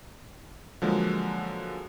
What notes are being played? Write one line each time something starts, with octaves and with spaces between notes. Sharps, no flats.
D3 F3 F#3 G#3 A#3